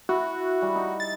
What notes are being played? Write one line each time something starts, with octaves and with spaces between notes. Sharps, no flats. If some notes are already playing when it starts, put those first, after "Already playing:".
E4 F#4
G3
D#4
A6